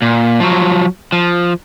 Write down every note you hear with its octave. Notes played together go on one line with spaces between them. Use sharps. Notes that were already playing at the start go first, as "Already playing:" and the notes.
A#2
F3 F#3
F3